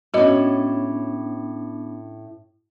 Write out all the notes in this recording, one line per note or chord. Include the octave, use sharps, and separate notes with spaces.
A2 B3 C#4 D4 F#4 D#5